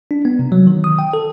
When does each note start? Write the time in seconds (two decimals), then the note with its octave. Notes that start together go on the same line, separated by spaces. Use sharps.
0.11 D4
0.25 B3
0.39 C3
0.52 F#3
0.67 D#3
0.84 D#6
0.99 G5
1.13 A4